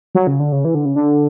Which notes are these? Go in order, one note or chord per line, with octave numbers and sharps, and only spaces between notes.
F#3
C#3
D3
C#3
E3
D3
C#3
D3